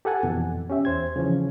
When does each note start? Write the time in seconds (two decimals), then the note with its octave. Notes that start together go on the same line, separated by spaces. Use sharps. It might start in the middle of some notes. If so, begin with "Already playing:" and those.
0.05 G4 A4 F#5 G#5 A5
0.23 F2 B2 E3
0.70 C#4 G4 E5
0.85 E2 C5 G#6
1.16 C#3 E3 F3 C#4